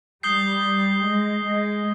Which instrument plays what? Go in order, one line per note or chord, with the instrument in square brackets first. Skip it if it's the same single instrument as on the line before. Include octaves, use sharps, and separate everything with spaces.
[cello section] G3 [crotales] D#6 G6 C7 G7
[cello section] G#3
G#3